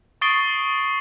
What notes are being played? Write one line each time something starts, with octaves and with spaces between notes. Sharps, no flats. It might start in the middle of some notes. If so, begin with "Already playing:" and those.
C#6 D#6 A6 C7 D7 G7